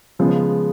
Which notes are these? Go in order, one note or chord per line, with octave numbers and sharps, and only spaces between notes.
C#3 F3 G#3 B3